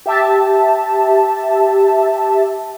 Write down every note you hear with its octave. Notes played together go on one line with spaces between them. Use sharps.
G4 E5 A5